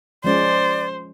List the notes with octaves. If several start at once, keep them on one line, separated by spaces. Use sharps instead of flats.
F3 G#3 C#4 C5 D5